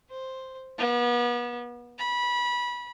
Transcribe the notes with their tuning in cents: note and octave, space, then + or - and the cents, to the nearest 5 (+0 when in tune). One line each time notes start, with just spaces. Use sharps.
C5 +0
B3 -35
B5 -20